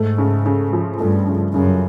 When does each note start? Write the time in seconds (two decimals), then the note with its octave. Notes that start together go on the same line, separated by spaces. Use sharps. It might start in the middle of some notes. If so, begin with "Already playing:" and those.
Already playing: G#2 A3
0.18 C#3
0.46 C#3
0.73 F3
1.00 G2 A3
1.27 C#3
1.54 F#2 C#3